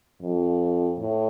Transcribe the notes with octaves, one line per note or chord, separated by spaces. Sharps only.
F2
A2